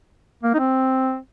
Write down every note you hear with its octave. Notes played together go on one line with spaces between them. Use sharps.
A#3
D#4
C4